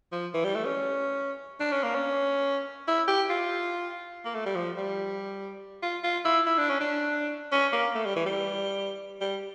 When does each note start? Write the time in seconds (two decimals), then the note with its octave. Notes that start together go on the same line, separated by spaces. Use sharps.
0.12 F3
0.34 E3
0.45 G3
0.55 A3
0.65 C#4
1.60 D4
1.72 C#4
1.83 A#3
1.95 C#4
2.88 E4
3.08 G4
3.30 F4
4.25 A#3
4.35 A3
4.46 G3
4.56 F3
4.77 G3
5.83 F4
6.04 F4
6.25 E4
6.46 E4
6.58 D4
6.69 C#4
6.81 D4
7.52 C#4
7.73 A#3
7.95 A3
8.05 G3
8.16 E3
8.26 G3
9.21 G3